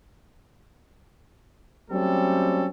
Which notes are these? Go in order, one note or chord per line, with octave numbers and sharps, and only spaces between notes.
F#3 G3 A3 C4 C#4 A4